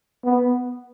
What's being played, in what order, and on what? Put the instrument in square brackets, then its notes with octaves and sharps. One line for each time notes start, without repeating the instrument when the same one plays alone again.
[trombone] B3